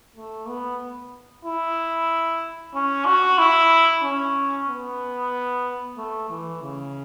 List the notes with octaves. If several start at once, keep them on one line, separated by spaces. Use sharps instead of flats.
A3
B3
E4
C#4
F#4
E4
C#4
B3
A3
E3
C#3